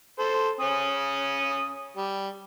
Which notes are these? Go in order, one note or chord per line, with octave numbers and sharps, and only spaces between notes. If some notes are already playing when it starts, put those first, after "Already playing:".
A4 C5
C#4 D#6
G3